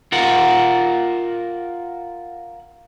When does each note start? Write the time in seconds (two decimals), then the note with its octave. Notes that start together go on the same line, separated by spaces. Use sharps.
0.12 F4 A#4 F#5